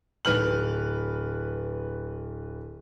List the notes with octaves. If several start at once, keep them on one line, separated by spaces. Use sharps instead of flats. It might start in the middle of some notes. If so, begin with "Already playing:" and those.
D1 B4 F6 F#7